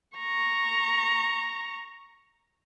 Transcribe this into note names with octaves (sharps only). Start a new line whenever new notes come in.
A#5 C#6